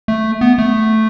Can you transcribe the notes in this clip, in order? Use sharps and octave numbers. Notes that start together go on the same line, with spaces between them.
A3
B3
A3